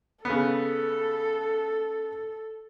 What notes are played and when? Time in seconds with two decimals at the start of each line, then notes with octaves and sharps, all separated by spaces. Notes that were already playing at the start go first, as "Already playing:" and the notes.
0.25 C#3 B3 A4